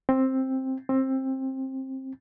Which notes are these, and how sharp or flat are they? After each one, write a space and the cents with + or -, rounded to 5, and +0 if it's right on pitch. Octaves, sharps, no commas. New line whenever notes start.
C4 +10
C4 +20